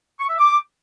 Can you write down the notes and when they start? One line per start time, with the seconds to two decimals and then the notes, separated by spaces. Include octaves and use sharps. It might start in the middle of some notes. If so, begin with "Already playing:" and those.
0.19 C#6
0.29 E5
0.38 D6